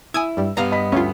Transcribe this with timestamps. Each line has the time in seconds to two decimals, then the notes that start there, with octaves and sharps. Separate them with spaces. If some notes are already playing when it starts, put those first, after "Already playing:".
0.14 E4 G#5 D#6 E6 G#6
0.37 G2 G3
0.57 G2 B3 F5 A#5
0.72 D#5 B5 B6
0.92 D2 C#4 F4